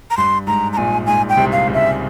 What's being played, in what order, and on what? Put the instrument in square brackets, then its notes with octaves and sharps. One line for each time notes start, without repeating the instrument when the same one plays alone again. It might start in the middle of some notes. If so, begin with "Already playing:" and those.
[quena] A#5
[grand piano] G2 [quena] C6
[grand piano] G#2 [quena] A#5
[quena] A#5
[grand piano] A#1 A#2 [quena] G#5
[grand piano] G#2 [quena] G#5
[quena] G5
[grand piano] C2 C3
[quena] F5
[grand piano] C#2 C#3
[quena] E5